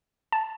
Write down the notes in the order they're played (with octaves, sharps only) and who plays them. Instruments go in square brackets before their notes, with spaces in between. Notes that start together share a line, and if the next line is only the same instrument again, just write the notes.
[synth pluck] A5